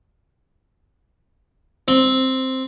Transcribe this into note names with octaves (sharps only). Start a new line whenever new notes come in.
C4